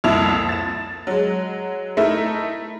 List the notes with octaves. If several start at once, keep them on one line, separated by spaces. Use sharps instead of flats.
C2 F2 A#2 E4 A5 F7
A6 E7
F#3 G#3
A3 D#4 E4 A#4